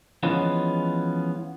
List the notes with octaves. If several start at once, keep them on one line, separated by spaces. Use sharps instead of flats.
E3 F3 G#3 B3 C#4 F4